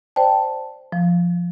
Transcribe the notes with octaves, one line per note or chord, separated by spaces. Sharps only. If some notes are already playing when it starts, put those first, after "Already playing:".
C5 D5 G5 A5
F3